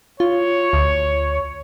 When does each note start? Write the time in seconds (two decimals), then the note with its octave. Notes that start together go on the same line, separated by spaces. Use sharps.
0.20 F4 C#5
0.73 D2